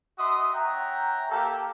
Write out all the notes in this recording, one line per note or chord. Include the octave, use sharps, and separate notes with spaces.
D#4 F#4 D#5 E5 C6 D#6
C#4 E5 F#5 G5 A#5
A#3 G4 A4